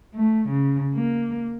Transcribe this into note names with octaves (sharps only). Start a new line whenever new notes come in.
A3
C#3
A#3